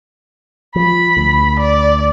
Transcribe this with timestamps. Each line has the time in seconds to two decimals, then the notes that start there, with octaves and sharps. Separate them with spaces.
0.76 F3 B5
1.17 D2
1.59 D5